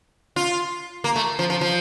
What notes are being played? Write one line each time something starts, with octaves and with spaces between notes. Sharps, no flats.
F4
A#3
A3
F3
F3
F3